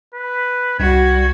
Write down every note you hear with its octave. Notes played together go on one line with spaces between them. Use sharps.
B4
C2 G3 F#4 G#6